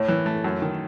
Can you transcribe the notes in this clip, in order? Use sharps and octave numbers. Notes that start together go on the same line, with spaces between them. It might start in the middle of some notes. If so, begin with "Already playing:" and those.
Already playing: A2 C#5
E3
A3
F#2
D#3